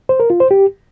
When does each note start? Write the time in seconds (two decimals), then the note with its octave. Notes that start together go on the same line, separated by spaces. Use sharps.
0.09 C5
0.20 A#4
0.30 F4
0.40 C5
0.51 G4